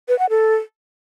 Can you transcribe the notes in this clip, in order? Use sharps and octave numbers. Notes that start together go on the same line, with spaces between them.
B4
F#5
A4